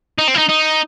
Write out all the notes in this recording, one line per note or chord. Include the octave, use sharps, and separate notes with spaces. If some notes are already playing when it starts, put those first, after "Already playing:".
D#4
C4
E4
D#4
D#4